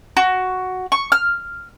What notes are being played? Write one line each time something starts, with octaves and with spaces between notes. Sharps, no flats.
F#4
C#6
F6